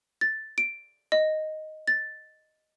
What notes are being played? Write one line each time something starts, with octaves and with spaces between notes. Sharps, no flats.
A6
D7
D#5
A6